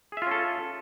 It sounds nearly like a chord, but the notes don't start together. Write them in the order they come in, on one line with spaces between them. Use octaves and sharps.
G#4 E5 F4 C#4 A4